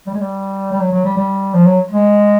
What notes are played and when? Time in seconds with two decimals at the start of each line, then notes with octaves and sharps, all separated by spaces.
0.06 G3
0.14 G#3
0.21 G3
0.72 G3
0.80 F#3
0.93 F#3
1.05 G3
1.17 G3
1.54 F3
1.66 F#3
1.91 G#3